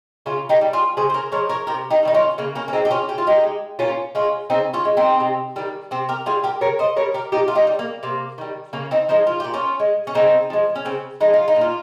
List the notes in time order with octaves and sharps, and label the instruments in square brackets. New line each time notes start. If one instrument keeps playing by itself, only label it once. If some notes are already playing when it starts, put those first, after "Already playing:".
[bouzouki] C#3 C#4 F4
D#4 G4
G3
F4 G#4
C#3 G#4 C5
C5
A#4 C#5
F3 G#3 A#4 C#5
A#4 C#5
C3 G4 A#4
D#4 G4
D#3 G3 D#4
C#4 F4
C#3 A#3
A#3 C#4
C#4
G#3 C4 D#4
G4
C#4 F4
C#3 G4
F4
D#4 G4
G#3
A#2 C#4 F4
G#3 C#4 F4
C#3 C4 D#4
C#4 F4
G#3
C4 D#4
C3
D#3 G3
C3 C4
G4 A#4
G3 F4 G#4
G4 A#4
C#3 A#4 C#5
C5 D#5
G3 A#4 C#5
G4 A#4
A#2 D#4 G4
F4
D#4 G4
G3
A#3
C3 A#3
D#3 G3
C#3 A#3 C#4
C4 D#4
F3 G#3 C4 D#4
F4
A#2 G4
C#4 F4
G#3
C#4
C#3 C4 D#4
F3 G#3
C#4
C#3 C4
F3 G#3 D#4
F4
D#4
A#2
F4